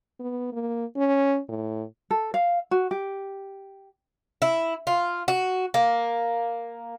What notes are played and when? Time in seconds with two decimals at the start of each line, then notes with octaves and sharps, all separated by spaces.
0.20 B3
0.53 A#3
0.96 C#4
1.49 A2
2.11 A4
2.34 F5
2.71 F#4
2.91 G4
4.42 E4
4.87 F4
5.28 F#4
5.74 A#3